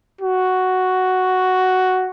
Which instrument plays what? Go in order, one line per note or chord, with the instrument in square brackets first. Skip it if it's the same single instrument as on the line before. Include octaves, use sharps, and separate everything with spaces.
[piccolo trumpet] F#4